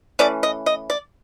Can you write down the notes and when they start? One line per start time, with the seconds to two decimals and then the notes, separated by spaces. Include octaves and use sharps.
0.19 E3 A3 C#4 D5
0.43 D#5
0.66 D#5
0.90 D5